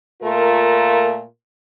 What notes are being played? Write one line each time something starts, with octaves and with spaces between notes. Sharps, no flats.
A#2 A3 F4 A#4